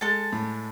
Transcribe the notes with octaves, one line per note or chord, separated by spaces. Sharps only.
G#3 A4 A5
A2